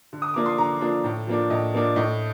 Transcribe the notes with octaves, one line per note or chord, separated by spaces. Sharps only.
D3
D#6
F3 A#3 D4 D6
C6
D3 A#5
F3 A#3 D4
A2
F3 A#3 D4
A2 D#5
F3 A#3 D4
A2 D#5